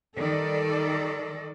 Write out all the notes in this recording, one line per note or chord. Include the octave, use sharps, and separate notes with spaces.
D#3 G3 A4 D5